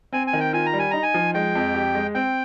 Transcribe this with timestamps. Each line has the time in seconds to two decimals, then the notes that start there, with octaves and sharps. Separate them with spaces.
0.13 C4 G#5
0.27 G#5
0.33 D#3
0.40 G5
0.53 F4 G#5
0.66 A#5
0.73 G3
0.79 G#5
0.91 D#4 A#5
1.03 G#5
1.14 F3
1.34 G#3 G5
1.55 F2
1.74 G4
1.95 G#3
2.15 C4 G5